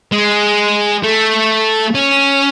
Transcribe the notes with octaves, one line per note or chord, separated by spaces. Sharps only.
G#3
A3
C#4